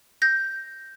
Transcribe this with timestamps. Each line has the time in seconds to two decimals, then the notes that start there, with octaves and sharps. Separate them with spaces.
0.22 G6 A#6